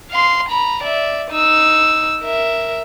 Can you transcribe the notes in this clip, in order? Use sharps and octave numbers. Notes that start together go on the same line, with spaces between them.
F5 C6
A#5 B5
D5 E5
D#4 E6
A#4 E5